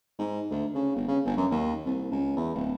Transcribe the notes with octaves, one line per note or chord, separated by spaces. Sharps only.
G#2
D2
C#3
G1
C#3
G1
F#2
D#2
C2
C#2
E2
D1